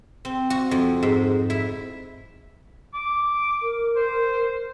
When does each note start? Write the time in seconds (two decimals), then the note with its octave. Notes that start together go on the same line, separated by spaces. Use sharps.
0.25 C4
0.50 F#4
0.71 F2
1.03 G#2
1.50 E4
2.94 D6
3.63 A#4
3.96 C5